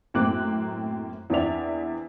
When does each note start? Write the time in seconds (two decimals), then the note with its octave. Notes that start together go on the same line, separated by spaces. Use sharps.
0.14 F#2 A2 A#3 C4 D6 F#6
1.30 E2 C4 D4 D5 E5 F7